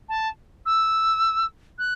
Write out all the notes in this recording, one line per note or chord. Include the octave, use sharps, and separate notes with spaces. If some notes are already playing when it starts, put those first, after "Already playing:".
A5
E6
F#6